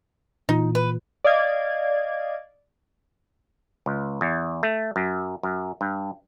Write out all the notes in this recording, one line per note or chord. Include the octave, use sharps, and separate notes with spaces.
A#2 E3 D#4 F4
B4
D5 D#5 F5 G#6
C#2
E2
A3
F#2
F#2
G2